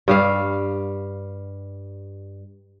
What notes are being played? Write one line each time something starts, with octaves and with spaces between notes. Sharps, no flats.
G2 G3 F5